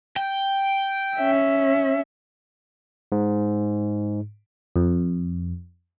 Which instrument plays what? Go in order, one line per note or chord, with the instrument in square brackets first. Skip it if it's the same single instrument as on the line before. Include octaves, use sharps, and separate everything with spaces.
[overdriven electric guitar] G5
[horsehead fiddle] C#4 E5
[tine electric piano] G#2
[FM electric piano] F2